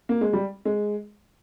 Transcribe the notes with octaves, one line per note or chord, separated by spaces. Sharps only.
A#3
G#3
G3
G#3